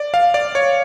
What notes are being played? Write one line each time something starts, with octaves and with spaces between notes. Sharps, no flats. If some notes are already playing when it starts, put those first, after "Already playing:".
Already playing: D5
F5
D5
C#5